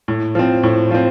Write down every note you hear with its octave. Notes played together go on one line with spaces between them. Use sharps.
A2
F3 C4
A2
F3 C4